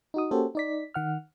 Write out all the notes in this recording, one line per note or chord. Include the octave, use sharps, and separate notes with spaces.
D#4 F#4 D#6
A#3 C#4 F#4 G4 A4 C5
D#4 D5 B6
D#3 F#5 F6